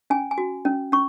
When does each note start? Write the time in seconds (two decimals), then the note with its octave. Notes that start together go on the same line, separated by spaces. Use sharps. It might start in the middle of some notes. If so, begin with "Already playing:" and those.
0.10 C#4 G#5
0.31 G#5
0.38 F#4
0.65 C#4
0.92 C#4 C#6